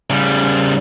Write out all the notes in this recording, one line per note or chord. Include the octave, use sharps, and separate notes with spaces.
C#3 G3